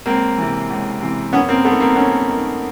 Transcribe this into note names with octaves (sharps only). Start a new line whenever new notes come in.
C#2 A#3 C4
C3 E3
C#2
C3 E3
F#2 B3 C#4
A#3 C4
D#3 A3 B3
A#3 C4
F#2 B3 C#4
D#3